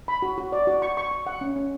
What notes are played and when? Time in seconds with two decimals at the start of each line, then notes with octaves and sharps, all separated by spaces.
0.08 B5
0.22 F#4
0.38 F#4
0.52 D5
0.67 F#4
0.82 C#6
0.97 C#6
1.11 C#6
1.27 F#5
1.41 C#4
1.56 C#4